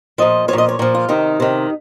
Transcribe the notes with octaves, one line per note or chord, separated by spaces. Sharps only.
A#2 F3 D#5
F3 C#5
A#2 D#5
C#5
A#2 F3
F4
C3 D#3 D#4
C3 D#3